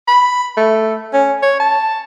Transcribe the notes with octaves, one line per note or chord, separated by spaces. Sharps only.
B5
A3
C#4
C#5
A5